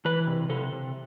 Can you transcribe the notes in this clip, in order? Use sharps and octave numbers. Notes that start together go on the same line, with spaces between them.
E3 B4
C3
C3 A4
C3